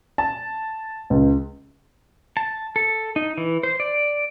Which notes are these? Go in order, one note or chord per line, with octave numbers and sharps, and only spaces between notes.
A5
C#2
A5
A4
D#4
E3
C5
D5